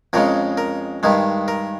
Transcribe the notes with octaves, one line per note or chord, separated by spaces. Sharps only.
F2 C#3 G#3 A#4
A#4
G2 D#3 G#3
A#4